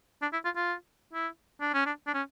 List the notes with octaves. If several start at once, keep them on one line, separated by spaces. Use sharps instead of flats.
D4
E4
F4
F4
E4
D4
C#4
D4
D4
C#4